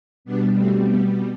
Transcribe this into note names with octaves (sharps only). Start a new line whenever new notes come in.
B2 G3 B3 D4
A3 C4
B3